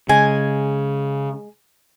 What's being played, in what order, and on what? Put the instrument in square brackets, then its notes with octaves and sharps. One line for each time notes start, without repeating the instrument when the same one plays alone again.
[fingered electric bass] C#3 [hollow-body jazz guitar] G#3 [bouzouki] G#5